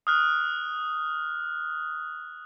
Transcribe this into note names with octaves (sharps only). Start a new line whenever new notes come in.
D#6 F6 F#6